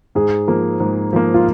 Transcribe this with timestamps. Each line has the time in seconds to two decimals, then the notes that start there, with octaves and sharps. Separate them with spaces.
0.15 G#2 G#4
0.47 F3 A#3
0.80 G#2
1.13 F3 A#3
1.34 F4